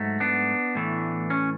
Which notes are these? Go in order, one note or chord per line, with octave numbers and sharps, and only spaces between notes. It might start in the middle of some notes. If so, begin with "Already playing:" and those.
Already playing: G#2 F#3 A3
B3 D4
A2 E3 A3
C#4